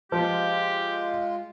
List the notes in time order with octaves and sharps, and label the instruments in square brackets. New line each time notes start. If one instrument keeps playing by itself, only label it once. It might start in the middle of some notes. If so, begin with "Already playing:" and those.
[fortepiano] F3 [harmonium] G#3 F4 [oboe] G4